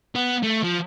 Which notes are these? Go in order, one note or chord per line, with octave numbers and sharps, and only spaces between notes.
B3
A3
F3